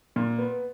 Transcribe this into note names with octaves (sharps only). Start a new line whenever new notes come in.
A#2
B3